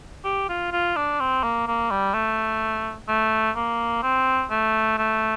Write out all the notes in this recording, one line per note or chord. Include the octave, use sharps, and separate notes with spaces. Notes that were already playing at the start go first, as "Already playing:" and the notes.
G4
F4
F4
D4
C4
A#3
A#3
G3
A3
A3
A#3
C4
A3
A3